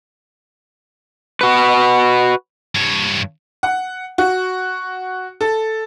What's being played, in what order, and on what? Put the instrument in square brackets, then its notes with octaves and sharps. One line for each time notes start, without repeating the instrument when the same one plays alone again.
[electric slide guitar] F#4 B4
[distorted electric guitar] G2 C#5
[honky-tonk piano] F#5
F#4
A4